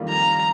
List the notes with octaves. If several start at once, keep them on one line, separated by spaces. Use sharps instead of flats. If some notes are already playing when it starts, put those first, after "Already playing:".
Already playing: F2 D#3 G3 A#3 F4
A#5